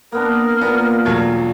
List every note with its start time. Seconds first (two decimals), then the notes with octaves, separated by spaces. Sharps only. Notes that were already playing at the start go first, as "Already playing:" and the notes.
0.12 A#3 B3 D4 A#4
0.61 A#2 B3 F5
1.05 E1 F#3 A3